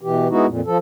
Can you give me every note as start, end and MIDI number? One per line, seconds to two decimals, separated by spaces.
0.01 0.28 47
0.01 0.28 52
0.01 0.28 67
0.30 0.46 56
0.30 0.46 59
0.30 0.46 63
0.30 0.46 64
0.30 0.46 66
0.46 0.61 41
0.46 0.61 46
0.66 0.78 53
0.66 0.78 69